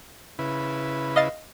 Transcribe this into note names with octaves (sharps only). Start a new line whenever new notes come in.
C#3 E4 B4
D#5 F5 A6